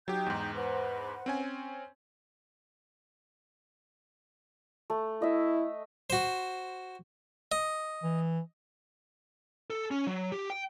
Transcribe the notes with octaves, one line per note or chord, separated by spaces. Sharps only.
F#3 D#4 G4 G5 G6
E2 G#2
B4 C5 F#5
C4 C#4 G#5
A3
E4 D#5 E5
F#4 C5
D#5
E3
A4
C#4
F#3
G4
G5